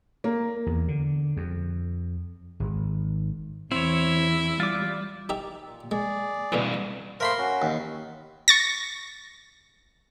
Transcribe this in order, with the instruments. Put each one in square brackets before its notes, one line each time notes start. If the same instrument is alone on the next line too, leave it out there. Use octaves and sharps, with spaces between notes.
[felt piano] A#3
[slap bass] E2
D3
F2
G#1
[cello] E2 [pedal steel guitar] C4 C#5 [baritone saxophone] E4
[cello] G3 [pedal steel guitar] F4 D6
[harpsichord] D#4 G4 E5
[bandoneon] A#2
[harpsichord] G#3 [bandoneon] G#4 D5
[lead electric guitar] C2 G2 [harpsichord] B2 D3 E3
[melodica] A3 A#3 C5 [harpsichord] A#4 B5 C6
[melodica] C#4 F#4
[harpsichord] D#2
[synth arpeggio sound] C#6 A6 A#6